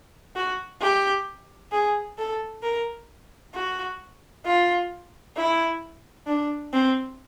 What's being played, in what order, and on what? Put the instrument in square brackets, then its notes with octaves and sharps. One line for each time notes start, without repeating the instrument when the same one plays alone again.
[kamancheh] F#4
G4
G#4
A4
A#4
F#4
F4
E4
D4
C4